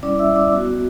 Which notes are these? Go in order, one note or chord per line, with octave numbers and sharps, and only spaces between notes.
G3 C#4 E4 D5 D6
E5 E6
D5 D6
B3 F#4